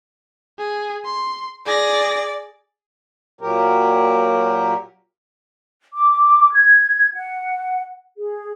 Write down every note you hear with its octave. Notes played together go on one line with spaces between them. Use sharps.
G#4
C6
G#4 D5 A#6
A#2 F#3 G4 A#4
D6
G#6
F#5
G#4